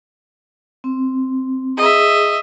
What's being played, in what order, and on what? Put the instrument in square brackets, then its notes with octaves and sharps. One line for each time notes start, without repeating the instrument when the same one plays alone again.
[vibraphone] C4
[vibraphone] G#4 [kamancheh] D#5 E5